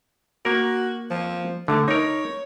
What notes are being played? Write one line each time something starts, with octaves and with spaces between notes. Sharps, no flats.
A#3 F#4 A#4
F3
D3 A3
D#4 A#4 C#5